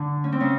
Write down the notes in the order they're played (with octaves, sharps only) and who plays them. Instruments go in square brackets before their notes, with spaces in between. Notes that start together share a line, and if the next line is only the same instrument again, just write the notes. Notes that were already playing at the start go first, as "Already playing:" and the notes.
Already playing: [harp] D3 D4
C#4
C4
C#3 C#4